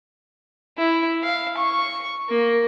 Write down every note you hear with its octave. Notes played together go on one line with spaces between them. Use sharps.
E4
F5
C#6
A#3